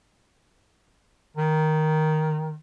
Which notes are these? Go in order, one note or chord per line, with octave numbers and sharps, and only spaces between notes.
D#3